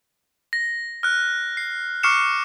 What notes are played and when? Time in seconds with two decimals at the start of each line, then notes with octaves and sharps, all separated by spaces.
0.53 A#6
1.03 F6 F#6
1.57 C7
2.03 C#6 D6 F6 C7 C#7 E7